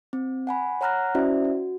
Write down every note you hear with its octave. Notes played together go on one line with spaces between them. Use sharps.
C4
F#5 G#5 B5
C#5 F#5 A#5 F6 F#6 A#6
C#4 E4 F#4 C5 D5 E5
F#4